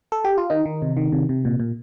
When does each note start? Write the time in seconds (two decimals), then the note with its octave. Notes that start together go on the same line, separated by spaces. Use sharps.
0.12 A4
0.24 G4
0.38 F4
0.50 D#3 D#4
0.65 D#3
0.82 C3
0.97 D#3
1.12 C3
1.29 C3
1.45 A#2
1.60 A#2